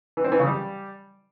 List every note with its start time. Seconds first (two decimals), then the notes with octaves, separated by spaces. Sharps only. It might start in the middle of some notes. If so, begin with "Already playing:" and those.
0.17 E3
0.24 C4
0.32 E3
0.39 C#3
0.46 G3